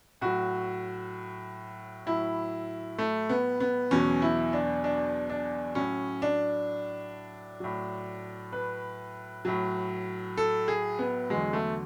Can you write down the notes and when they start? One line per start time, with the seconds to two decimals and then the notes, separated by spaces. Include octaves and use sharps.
0.21 A2 F#3 F#4
2.06 A2 F#3 E4
2.98 A3
3.29 B3
3.60 B3
3.91 E2 B2 F#3 C#4
4.22 E4
4.53 D4
4.84 D4
5.30 D4
5.75 A2 F#3 C#4
6.22 D4
7.60 A2 F#3
8.53 B4
9.45 A2 F#3
10.37 A4
10.68 G#4
10.99 B3
11.30 E2 D3 F#3 G#3
11.53 A3